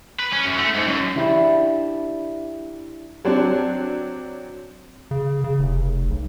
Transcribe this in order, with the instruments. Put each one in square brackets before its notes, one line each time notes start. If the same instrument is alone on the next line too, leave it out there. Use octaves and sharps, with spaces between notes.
[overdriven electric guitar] B4
C#4
F#2
A3
G#2
F#2
[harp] D4 E4 G4 E5 A5 B5
[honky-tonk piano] F#3 C4 D4
[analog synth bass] C#3
C#3
F1
B1